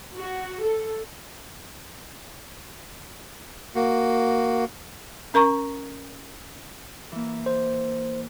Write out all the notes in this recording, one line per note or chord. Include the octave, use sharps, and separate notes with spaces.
F#4
A4
A#3 F#4
C#4 A#4 A#5 C#6
E3 A#3
C5